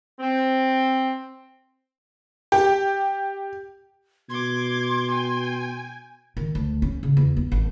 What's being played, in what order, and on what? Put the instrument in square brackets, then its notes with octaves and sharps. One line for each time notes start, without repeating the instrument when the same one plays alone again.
[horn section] C4
[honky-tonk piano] G4
[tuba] B2 [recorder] C6 [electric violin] D6 G#6
[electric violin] G5 G#5
[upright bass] D#3
D2
C#4
C#3
E2
B3
G#1